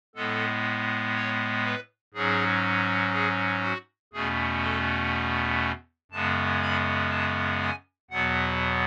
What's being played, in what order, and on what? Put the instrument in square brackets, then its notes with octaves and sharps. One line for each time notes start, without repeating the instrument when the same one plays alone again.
[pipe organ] A2 G#3 B3 A4
C#5
B4
G#2 F#3 C#4 G#4
G#4
F#4
E2 B2 A3 C#4 G#4
A4
F#2 C#3 G#3 B3 A5
B5
A5
G#5
E2 B2 F#3 B3 F#5